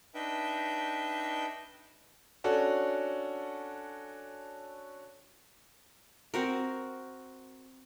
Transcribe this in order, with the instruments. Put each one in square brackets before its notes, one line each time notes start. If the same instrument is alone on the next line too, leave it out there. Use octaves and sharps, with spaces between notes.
[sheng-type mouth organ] D4 D#4 B4 E5 G5 G6
[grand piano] C#4 D4 F#4 A4
[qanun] C4 F#4 A#4